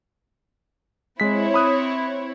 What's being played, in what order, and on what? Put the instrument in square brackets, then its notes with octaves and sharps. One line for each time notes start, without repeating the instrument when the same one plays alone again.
[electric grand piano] G#3 B6 [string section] C4 E4 C#5
[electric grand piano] B5 D#6 F#6